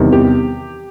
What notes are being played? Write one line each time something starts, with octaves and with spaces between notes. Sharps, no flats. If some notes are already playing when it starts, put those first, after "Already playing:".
Already playing: E2 C3 D#3 G3
G4